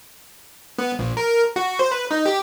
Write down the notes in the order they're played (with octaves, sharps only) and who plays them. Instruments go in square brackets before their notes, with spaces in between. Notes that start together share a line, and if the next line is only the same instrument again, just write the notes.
[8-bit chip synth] B3
A#1
A#4
F#4
C5
B4
D#4
G4